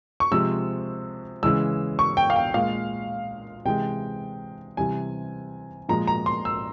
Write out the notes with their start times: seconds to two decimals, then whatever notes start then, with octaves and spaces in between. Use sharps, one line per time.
0.20 C#6
0.31 C3 F3 G#3 E6
1.43 C#3 E3 G#3 E6
1.99 C#6
2.17 G5
2.30 F5
2.36 G5
2.54 A#2 G#3 F5
3.65 C3 E3 G#3 G5
4.77 C3 E3 G3 G#5
5.89 A#2 F3 G#3 A#5
6.07 A#5
6.26 C6
6.45 E6